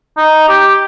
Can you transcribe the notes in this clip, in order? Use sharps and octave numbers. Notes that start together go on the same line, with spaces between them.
D#4
G4